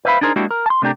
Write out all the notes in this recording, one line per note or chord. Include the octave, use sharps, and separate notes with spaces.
B4 C5 E5 F5 B5
D4 D#4 G#4 A#4 C5
G#3 A#3 D4 E4 F#4 G4
A#4
A5 C6
C3 A3 D4 G4 A#4